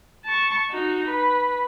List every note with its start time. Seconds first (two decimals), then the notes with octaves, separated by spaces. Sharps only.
0.25 A5 C#6
0.70 D#4 F#4
1.09 B4